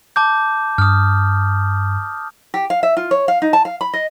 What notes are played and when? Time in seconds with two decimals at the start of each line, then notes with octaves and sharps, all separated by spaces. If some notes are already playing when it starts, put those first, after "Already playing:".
0.16 A5 D6 G6
0.78 G2 D#6 F6
2.54 G4
2.70 F5
2.83 E5
2.97 F4
3.11 C#5
3.28 F5
3.42 D#4
3.53 A5
3.65 F5
3.81 B5
3.93 D#5